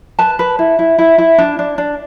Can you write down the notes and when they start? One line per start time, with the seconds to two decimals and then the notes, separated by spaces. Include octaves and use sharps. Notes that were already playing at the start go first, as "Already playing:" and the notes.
0.19 B4 A5
0.39 B4
0.59 E4
0.79 E4
0.98 E4
1.18 E4
1.38 D4
1.59 D4
1.78 D4